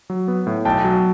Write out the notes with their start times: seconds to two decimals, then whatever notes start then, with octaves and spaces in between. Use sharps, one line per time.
0.10 F#3
0.28 B3
0.47 A2
0.65 B1 G5 A5
0.84 F#3